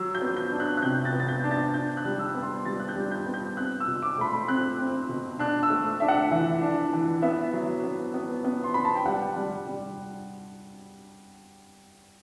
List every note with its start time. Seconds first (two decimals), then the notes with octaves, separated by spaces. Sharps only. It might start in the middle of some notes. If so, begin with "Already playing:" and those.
Already playing: F#3 E6
0.15 G6
0.22 B3
0.37 G6
0.52 D4
0.60 F#6
0.77 F#6
0.82 C3 G6
1.05 A6
1.13 B3
1.20 A6
1.28 G6
1.44 D4
1.51 A6
1.74 D4 G6
1.97 F#6
2.05 G3
2.19 E6
2.35 B3
2.43 C6
2.65 G3 A6
2.80 F#6
2.88 G6
2.96 G3
3.11 G6
3.27 B3
3.34 G6
3.57 C4 F#6
3.80 E6
3.88 B2
4.02 D6
4.18 A3 B5
4.25 C6
4.48 C4 F#6
4.78 C4
5.09 B2
5.39 D4 F#6
5.63 E6
5.70 A3
6.00 D4 E5
6.08 F#5
6.31 E3 E5
6.62 D4
6.93 E3
7.22 B3 E5
7.53 F#3
7.84 B3
8.14 B3
8.44 B3
8.64 C6
8.74 B3 B5
8.85 A5
8.95 G5
9.05 G3 F#5
9.36 G3
9.67 G3